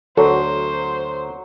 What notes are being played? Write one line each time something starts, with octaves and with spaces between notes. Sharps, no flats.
D2 F#3 A4 C5